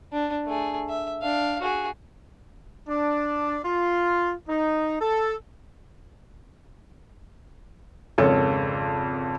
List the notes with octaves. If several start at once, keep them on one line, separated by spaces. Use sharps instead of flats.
D4
A3 G#4
E5
D4 F5
F#4 G#4
D4
F4
D#4
A4
G#1 F2 C#3 A4 C#5